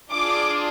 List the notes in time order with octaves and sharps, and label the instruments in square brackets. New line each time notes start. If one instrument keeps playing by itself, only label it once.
[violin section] D4 F4 G#4 D6